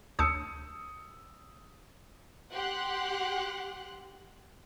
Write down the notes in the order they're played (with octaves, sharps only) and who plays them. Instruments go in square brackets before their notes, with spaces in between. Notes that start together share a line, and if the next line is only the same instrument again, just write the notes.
[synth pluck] D2 A5 G6 [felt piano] D#6 E6 C#7
[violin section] G4 F#5 C6 F#6